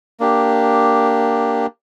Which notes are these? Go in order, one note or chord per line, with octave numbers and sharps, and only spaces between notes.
A#3 D4 G4